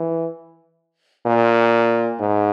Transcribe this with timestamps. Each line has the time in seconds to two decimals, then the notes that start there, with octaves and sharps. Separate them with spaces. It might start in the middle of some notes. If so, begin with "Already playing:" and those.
Already playing: E3
1.26 A#2
2.20 G#2